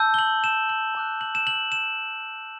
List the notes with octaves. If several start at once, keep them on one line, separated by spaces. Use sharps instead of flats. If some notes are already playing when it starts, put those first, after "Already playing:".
Already playing: A5 E6 G6
G7
F#7
E7
F#7
A5 D6 F#6
F#7
E7
F#7
E7